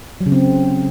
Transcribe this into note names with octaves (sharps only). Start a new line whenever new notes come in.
F#3
C#3
C4